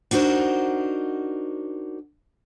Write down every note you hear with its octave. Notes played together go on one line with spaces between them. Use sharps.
D4 D#4 F#4 A#4 C5